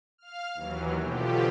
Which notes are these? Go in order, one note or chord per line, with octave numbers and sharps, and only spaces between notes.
F5 F6
D#2 E3 F#3
B2 D3 F3 G4